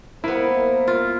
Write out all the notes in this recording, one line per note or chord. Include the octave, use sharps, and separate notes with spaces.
A#3 B3 E4 A#4 C5
F4